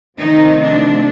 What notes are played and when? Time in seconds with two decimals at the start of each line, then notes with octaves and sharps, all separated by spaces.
0.19 C3 D#3 F3 A3 C4 D#4
0.62 D4